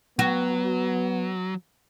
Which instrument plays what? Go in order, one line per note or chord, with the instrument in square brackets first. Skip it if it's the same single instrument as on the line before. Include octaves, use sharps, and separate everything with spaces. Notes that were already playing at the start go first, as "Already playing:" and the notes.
[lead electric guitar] F#3 [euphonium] B3 [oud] F#4